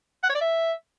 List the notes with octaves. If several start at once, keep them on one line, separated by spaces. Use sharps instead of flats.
F#5
C#5
D5
E5